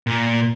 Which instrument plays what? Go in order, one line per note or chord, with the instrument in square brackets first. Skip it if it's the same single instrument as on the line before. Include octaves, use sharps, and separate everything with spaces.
[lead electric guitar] A#2